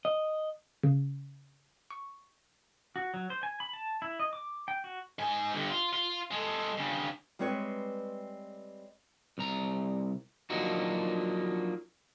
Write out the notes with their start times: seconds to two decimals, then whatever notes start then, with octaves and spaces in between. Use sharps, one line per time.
0.05 D#5
0.83 C#3
1.90 C#6
2.96 F#4
3.14 F#3
3.30 C5
3.43 G#5
3.60 B5
3.73 A5
4.02 E4
4.19 D#5
4.33 D6
4.68 G5
4.84 F#4
5.19 G#2 G#5
5.54 G2 D3
5.70 F4
5.93 F4
6.31 G#3 A4
6.77 G2 C#3
7.39 G3 G#3 C4 B4 C#5
9.38 C2 A#5
10.50 F3 F#3 A#3 D4 D#4 F#4